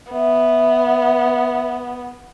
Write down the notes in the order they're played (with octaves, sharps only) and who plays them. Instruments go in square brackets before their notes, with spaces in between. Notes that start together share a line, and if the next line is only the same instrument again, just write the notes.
[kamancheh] B3 [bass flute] E5